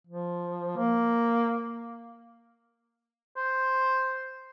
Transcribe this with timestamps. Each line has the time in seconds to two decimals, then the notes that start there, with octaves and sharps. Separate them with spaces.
0.07 F3
0.77 A#3
3.37 C5